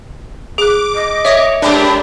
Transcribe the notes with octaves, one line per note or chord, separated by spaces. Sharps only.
G#4 D6 F#6
D#5
C#5 E5 D#6 A#6
G#3 D4 G4 A#4 B5